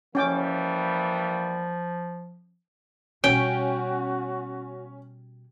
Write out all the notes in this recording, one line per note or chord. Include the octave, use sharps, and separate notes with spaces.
E3 F3 G3 A#3 C#4 G5 D6
B2 G3 C#4 F#4 G5